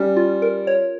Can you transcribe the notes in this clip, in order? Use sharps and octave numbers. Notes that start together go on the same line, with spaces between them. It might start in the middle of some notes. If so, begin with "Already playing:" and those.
Already playing: G3 C#4
F4
A#4
C#5